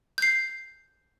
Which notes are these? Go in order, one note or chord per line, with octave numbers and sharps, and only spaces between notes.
G6 C7